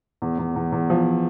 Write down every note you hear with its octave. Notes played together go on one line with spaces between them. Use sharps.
E2
E2
E2
E2
F3